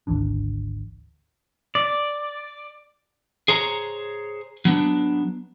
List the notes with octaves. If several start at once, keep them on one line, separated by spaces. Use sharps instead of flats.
G#1 D2 E3 D4
D5
G#4 C5 C#5 A#5
F#3 B3 D4